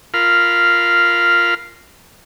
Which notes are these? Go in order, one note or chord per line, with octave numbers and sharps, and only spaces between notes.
F4 A#4 F5 B5 F6